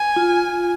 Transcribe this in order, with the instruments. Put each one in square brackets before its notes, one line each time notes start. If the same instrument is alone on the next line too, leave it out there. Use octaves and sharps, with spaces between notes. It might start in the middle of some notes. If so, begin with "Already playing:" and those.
Already playing: [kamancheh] G#5
[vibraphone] F4